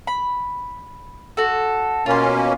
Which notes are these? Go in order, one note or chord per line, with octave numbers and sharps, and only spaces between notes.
B5
F#4 A4
B2 A#3 C#4 F4 C6